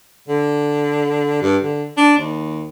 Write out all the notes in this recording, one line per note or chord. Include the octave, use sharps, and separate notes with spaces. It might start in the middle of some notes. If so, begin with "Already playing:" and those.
D3
G2
D3
D4
D#2